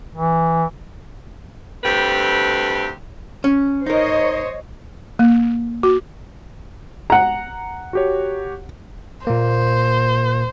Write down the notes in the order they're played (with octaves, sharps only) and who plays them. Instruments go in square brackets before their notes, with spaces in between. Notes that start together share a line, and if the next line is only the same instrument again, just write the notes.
[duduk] E3
[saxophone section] D2 G2 C4 G4 A4 B4
[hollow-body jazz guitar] C#4
[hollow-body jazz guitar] D#4 A#4 [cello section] C5 C#5 D#5
[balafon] A#3
F#4
[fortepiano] F#5 A#5
[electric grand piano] F#4 G4 C#5
[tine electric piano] A#2 A#3 [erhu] C5